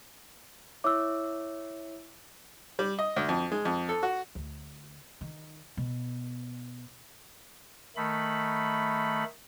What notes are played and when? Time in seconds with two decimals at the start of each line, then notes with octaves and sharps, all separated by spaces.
0.84 E4 C#5 E5 D6 E6
2.79 G3
2.99 D#5
3.16 D2
3.29 F2
3.52 G#3
3.65 F2
3.89 A4
4.03 F#4
4.35 D2
5.21 D#3
5.77 B2
7.96 D#3 A3 B5